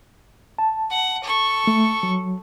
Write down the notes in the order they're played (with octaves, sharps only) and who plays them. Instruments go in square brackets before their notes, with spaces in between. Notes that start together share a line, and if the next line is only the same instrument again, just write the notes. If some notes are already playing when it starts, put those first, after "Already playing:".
[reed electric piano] A5
[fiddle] F#5
A4 C#6
[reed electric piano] A3
F#3